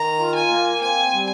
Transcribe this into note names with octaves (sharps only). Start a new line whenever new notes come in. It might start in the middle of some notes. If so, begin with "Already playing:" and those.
Already playing: D#3 A#5
F4
G#5
A#3
C4 G#5
G3